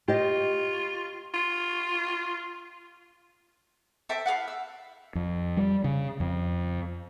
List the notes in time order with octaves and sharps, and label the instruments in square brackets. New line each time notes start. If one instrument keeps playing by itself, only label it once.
[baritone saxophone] F4 [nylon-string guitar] G4 D#5
[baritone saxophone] F4
[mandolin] A4 C5 E5 G5
E4 A4 F5 F#5
E6
[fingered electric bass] F2
G3
C#3
F2